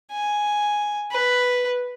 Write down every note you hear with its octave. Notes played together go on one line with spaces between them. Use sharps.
G#5
B4